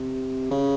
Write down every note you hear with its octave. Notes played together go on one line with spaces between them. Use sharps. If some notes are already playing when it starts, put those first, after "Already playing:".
Already playing: C3
C#3